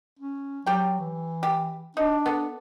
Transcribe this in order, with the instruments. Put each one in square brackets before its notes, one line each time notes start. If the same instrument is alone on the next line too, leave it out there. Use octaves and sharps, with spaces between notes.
[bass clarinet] C#4
[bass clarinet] F#3 [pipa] G4 G5
[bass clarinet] E3
[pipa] G4
[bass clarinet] D4 [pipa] D#4
[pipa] B3 A4